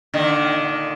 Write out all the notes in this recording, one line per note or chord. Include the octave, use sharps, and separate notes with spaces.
A#2 D3 D#3